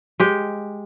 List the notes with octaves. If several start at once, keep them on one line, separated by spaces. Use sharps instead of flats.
G#3 G4